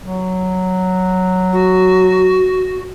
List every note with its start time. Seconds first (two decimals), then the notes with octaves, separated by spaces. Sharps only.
0.02 F#3
1.53 F#4